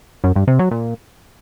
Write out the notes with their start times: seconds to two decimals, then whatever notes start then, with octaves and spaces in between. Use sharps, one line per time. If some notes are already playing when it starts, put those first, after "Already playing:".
0.24 F#2
0.36 G2
0.47 C3
0.59 F#3
0.71 A#2